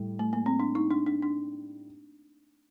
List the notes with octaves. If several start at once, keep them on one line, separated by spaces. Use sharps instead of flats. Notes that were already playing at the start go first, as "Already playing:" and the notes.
Already playing: A2 G3
A3
A#3
C4
D4
D#4
D4
D4
D4